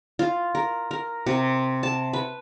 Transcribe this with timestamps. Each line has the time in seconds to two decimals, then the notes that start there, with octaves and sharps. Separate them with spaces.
0.19 F4
0.55 A#4
0.91 A#4
1.26 C3
1.83 A5
2.13 B4